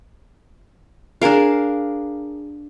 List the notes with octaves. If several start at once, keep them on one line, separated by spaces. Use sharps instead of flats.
D4 G#4 A#4 F5